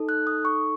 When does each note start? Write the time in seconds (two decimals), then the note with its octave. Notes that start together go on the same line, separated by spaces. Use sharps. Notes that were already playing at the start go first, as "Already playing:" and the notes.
Already playing: D#4 A4
0.09 F#6
0.27 D#6
0.45 C#6